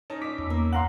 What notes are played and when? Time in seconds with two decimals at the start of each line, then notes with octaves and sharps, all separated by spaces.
0.10 C#4 D#4 A5
0.21 F4 D#5 D6 B6
0.38 E2
0.50 A#3
0.73 F5 F#5 A#5 C6 F#7